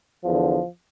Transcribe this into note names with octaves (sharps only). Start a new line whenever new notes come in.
E2 D3 F3